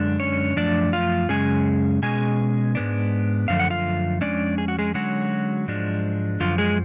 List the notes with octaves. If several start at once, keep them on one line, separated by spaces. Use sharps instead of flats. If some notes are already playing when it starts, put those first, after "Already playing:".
Already playing: F#2 D3 G#3 D4
C#4 C#5
F#2 F3 A3 D4 D5
F4 F5
F#2 C#3 G#3 C#4 G#4 G#5
B2 G#3 C#4 G#4 G#5
G#2 G#3 B3 D4
F#2 D3 F3 A3 F5
F#5
F4 F5
F2 C#3 G#3 C#4 D4 D5
G#4
F#4
G#3 G#4
D3 F#3 G#3 C#4 F#4
G#2 F3 G#3 D4
F#2 D3 F3 F4
G#3 G#4